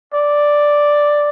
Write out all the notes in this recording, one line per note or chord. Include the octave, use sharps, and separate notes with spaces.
D5